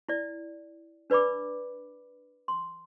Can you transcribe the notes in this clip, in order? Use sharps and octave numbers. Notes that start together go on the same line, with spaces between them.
E4 D5
D4 B4 D5 B5 D6
C6